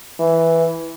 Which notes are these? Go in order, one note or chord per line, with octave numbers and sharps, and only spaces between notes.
E3